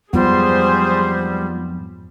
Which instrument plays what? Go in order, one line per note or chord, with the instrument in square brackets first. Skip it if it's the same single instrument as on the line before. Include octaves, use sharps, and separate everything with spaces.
[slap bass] F2 G#2 F#3 [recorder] G3 [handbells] B3 F4 [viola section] G#4 C5